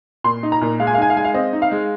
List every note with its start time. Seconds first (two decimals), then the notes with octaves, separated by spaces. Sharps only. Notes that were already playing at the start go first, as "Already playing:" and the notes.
0.24 A#2 C6
0.43 D#4
0.52 A#5
0.61 A#2
0.79 G#3 F5
0.87 G#5
0.94 F5
0.98 D#4 G#5
1.10 F5
1.16 G#3 G#5
1.24 F5
1.34 C4 D#5
1.53 D#4
1.62 F5
1.71 G#3